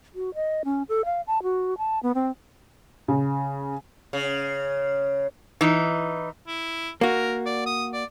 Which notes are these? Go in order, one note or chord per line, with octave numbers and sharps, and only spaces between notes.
F#4
D#5
C#4
A4
F5
A5
F#4
A5
B3
C4
C#3
C#3
E3 D#4
E4
A#3 F#4 A#4
D5
D#6
D5